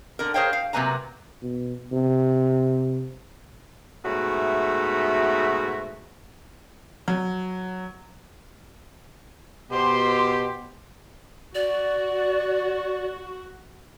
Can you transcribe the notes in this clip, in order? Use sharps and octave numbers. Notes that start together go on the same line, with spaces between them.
D3 A#4
G#4 A#4 C5 C#5 F5 G5
F5
C3 F#3 A#3 B4 G#5 A#5
B2
C3
G#2 B2 A3 F#4 E5
F#3
B2 G4 C5 C6
F#4 D5